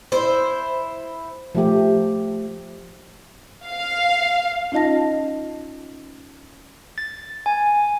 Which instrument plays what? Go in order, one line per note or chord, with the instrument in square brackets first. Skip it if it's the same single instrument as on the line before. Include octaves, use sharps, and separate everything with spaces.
[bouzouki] E4 C5
[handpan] F3 A3 G4
[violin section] F5
[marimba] C#4 D#4 F4 D#5 A5 A#6
[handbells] A6
G#5